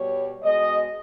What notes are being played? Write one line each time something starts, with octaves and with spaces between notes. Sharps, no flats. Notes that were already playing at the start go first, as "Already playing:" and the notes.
Already playing: B2 G3 C#5
B2 G#3 D#5